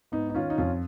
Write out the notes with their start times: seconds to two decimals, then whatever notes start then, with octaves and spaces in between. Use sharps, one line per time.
0.12 G#2 B3 D#4
0.30 D#4
0.35 D#3 C#4 F4
0.50 D#4
0.58 F2 C#4 F4